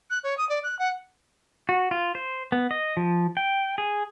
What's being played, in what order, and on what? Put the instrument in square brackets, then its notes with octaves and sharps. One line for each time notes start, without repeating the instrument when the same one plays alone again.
[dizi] F#6
C#5
D#6
D5
F#6
F#5
[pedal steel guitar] F#4
F4
C5
B3
D#5
F3
G5
G#4